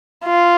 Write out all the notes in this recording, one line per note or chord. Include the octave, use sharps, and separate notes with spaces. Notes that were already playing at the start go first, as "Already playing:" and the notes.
F4